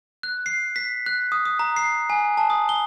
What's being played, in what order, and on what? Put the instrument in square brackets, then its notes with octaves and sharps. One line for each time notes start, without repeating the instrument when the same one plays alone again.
[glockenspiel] F#6
C7
B6
F#6
D#6
D#6
A#5
C7
G#5
A5
D#6
G7